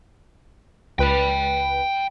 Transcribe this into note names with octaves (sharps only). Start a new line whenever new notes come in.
C#2 B4 G5 B5